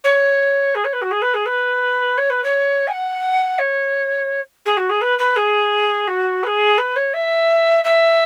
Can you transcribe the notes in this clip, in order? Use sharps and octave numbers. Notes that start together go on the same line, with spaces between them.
C#5
G#4
C#5
B4
F#4
G#4
B4
G#4
B4
C#5
B4
C#5
G#5
F#5
C#5
G#4
F#4
G#4
B4
B4
G#4
F#4
B4
G#4
B4
C#5
E5
E5